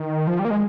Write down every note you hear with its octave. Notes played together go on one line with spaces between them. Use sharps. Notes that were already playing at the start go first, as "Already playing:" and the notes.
Already playing: D#3
F3
G3
A#3
G#3